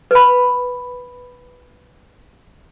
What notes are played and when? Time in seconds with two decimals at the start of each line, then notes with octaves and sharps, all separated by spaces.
0.11 B4 B5